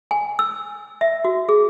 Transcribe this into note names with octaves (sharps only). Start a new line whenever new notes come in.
G#5
E6
E5
F#4
G#4